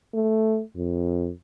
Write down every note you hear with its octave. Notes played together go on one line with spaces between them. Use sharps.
A3
F2